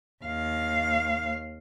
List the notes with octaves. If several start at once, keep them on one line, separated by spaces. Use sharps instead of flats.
D#2 F5